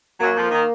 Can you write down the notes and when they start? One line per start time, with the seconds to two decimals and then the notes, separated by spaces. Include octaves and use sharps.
0.20 F#2 F#3 A#3
0.36 F2 F3
0.51 D#3